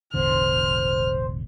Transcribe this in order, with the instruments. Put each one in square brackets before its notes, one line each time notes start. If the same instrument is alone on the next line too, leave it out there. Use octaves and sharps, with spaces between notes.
[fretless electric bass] E1 A1 D3 [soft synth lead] C5 [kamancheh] F6